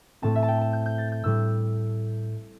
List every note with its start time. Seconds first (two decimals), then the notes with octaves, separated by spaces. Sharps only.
0.22 A2 A3 C4 A5
0.35 E5
0.43 A5
0.48 G5
0.61 A5
0.73 G6
0.86 G6
0.98 A6
1.12 G6
1.24 A2 G3 E6